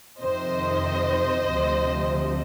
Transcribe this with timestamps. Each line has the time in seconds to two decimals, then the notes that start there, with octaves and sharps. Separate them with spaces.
0.22 F2 C3 D#3 C5 D#5
1.51 D2 C3 F3